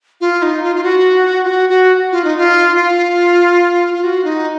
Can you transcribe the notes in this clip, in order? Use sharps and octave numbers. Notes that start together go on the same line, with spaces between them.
F4
D#4
F4
F4
F#4
F4
F#4
F#4
F4
D#4
F4
F4
F4
F#4
D#4